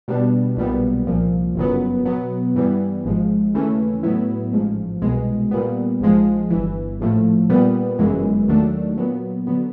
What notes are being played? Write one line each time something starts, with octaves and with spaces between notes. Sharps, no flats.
B2 G3 B3 D4
B1 A#2 G3 B3
C2 A#2 F3
G1 F#2 C#3 F#3 B3
B2 F#3 B3
G2 E3 G3 B3
G#1 G#2 F3 G#3
D#2 C#3 E3 A3 C#4
A2 F#3 B3 E4
A1 G#2 F3
C2 B2 G#3
A#2 G3 B3
A#1 G#2 F3 G#3
G1 G2 E3
A#1 A2 F3 A3
A#2 G3 B3
G1 F#2 C#3 E3 G#3
D#2 D#3 F#3 A3 D4
A#2 F#3 B3
D3 F#3 B3